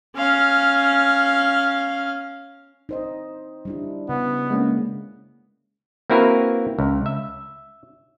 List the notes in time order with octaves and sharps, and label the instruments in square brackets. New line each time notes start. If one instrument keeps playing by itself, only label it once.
[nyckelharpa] C#4 F5
[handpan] D#4 C5 D#5
G3 D4 E4
[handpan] C#3 [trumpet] B3
[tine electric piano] G#3 A#3 C#4
[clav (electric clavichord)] A#3 C4 E4 F#4 A#4 B4
C#2
E5